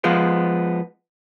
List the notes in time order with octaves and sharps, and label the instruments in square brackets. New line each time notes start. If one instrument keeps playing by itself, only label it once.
[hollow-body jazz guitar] F3 G#3 B3